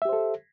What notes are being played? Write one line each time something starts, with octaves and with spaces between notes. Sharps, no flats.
G4 A4 C5 E5